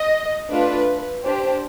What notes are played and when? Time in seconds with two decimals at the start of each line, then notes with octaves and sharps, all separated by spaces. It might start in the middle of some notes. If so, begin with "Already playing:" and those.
Already playing: D#5
0.51 A3 D4 F4 B4
1.25 D4 G4 C5